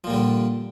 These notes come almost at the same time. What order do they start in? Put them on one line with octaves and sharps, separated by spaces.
F3 A#2 G3 D3